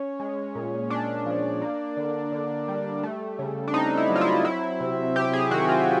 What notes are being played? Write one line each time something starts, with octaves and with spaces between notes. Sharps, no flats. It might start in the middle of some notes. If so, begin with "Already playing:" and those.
Already playing: C#4
G#3
A#2
C#4 D4
F3
A#3
D3
D3
G3
A3
C#3
D4
C4 D#4
E4
F#3
F4
E4
F#3 E4
C3
C3 G4
G#4
D#3 F#4
F4